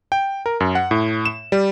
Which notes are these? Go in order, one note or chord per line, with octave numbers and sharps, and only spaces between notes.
G5
A#4
F#2
F#5
A2
E7
G3